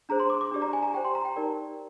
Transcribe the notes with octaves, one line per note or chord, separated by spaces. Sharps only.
D4 G#4 C5 A#5
C6
D6
D6
D4 G4 D5
A#5
G#5
A#5
G4 C5 G5
C6
A#5
G5
D#4 G4 A#4 D5